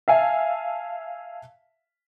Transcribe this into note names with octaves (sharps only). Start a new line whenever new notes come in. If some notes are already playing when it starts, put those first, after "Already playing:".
E5 F5 G#5 A5